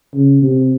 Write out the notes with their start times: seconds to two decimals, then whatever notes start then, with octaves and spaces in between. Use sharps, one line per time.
0.14 C#3
0.42 C3